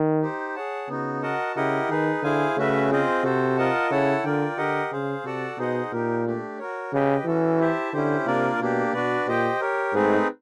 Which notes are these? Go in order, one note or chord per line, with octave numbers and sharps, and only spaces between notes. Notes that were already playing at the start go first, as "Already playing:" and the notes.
Already playing: D#3
D#4 G4 C5
G#4 C#5 F#5 A5
C#3 B3 D#4 F#4
F#4 A#4 D#5 F#5 A5
C#3 E4 G4 A#4 D#5 F#5
D#3 D#4 G#4 B4
D3 E4 G#4 C5 F5 G#5
C#3 A3 C#4 F#4 B4 E5
C4 F4 G#4 C5 D#5
C3 F#4 A4 C5
F4 A#4 D#5 F#5 A5
C#3 E4 A4 C#5 F#5 A5
D3 F4 A#4 D5 G5
D3 G4 A#4 D#5 F#5
C#3 G#4 C5 F5
C3 F#4 A4 D5 F#5 A5
B2 D#4 G#4 C5 D#5 F#5
A#2 D#4 G4 A#4
A3 D4 G4
F#4 A#4 C#5
C#3 G4 B4 D#5 G5
E3 C#4 F#4 A4
E4 G4 C5 E5 A5
D3 C#4 E4 G4 C5
C3 A#3 D4 F4 A#4 D5
B2 A#3 D4 G4
B2 D4 F#4 B4 D5
A#2 G4 C5 D#5 G5
G4 A#4 C#5
G#2 A3 C4 D#4 G#4 B4